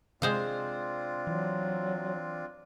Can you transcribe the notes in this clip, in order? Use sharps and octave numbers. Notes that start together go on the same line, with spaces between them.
C3 G#3 C4 D4 F4 C5 F5
E3 F#3